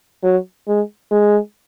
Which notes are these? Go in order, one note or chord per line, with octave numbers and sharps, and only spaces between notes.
F#3
G#3
G#3